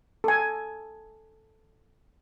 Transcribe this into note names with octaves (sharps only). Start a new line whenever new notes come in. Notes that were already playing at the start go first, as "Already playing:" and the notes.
A4 G#5